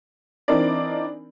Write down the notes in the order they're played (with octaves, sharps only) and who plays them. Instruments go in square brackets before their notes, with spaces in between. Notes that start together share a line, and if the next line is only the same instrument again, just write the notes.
[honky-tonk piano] E3 C4 D4 D#4 A#4 D5